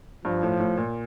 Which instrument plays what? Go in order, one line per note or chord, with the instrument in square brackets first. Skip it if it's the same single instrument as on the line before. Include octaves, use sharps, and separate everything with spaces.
[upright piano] G2 [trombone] F3
[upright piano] A2
A2
A#2